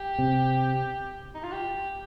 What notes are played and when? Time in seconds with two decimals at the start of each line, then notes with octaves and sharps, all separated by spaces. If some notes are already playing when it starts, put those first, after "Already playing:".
Already playing: G4
0.19 C3
1.35 D#4
1.43 F4
1.52 G4